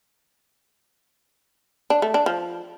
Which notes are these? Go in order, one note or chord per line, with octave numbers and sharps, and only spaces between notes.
D4
A3
D4
F3